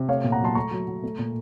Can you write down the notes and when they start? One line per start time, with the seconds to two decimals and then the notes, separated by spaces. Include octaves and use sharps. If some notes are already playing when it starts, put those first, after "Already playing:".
Already playing: C3
0.09 A3 C#5 F5
0.24 A#2
0.32 F#5 A#5
0.41 F#3 A5 C6
0.55 A3 A#5 C#6
0.71 F#3
0.88 F#3
1.03 A3
1.19 A#2